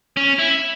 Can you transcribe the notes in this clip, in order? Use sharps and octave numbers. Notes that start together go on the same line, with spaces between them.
C#4
E4